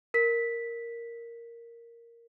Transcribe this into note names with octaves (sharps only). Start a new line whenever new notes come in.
A#4 B6